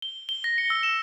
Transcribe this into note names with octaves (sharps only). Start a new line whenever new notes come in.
G7
G7
A#6
C#7
E6
E7